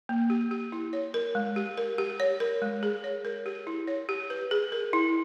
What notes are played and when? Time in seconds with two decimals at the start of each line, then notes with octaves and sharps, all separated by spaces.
0.09 A#3
0.30 G4
0.51 G4
0.72 E4
0.93 C#5
1.14 A#4
1.35 G#3
1.56 G4
1.78 A#4
1.98 G4
2.20 C#5
2.40 A#4
2.62 G#3
2.83 G#4
3.04 C#5
3.25 A#4
3.46 G4
3.67 E4
3.87 C#5
4.09 G4
4.30 B4
4.51 G#4
4.72 A#4
4.93 E4